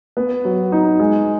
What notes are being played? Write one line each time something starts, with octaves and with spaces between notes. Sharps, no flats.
B3
F#3
D#4
G#3